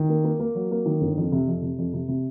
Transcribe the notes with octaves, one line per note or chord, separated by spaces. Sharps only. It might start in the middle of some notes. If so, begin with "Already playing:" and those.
Already playing: D#3
A#3
A#3
A#3
F#3
A#3
D#3
G1
F2
C3
F2
C3
F2
C3
C3